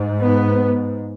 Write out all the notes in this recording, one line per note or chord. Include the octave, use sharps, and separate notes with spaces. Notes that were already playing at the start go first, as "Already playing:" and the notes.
Already playing: G#2
B3